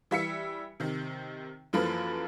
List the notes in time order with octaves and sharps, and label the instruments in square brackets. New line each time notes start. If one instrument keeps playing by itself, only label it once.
[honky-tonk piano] E3 G3 E5 E6 B6 C#7
C3 D#3
F#2 E3 F3 A#3 A4 B4